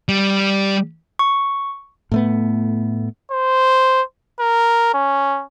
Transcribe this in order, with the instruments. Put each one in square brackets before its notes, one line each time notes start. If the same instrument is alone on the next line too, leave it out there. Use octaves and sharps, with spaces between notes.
[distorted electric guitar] G3
[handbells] C#6
[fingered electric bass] A2 A3 B3
[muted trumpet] C5
A#4
C#4